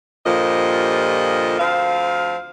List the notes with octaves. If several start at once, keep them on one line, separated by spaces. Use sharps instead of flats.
G2 A#2 F3 G4 A4 D#5
D2 F3 C4 F5